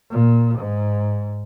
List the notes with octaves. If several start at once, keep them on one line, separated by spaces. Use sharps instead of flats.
A#2
G#2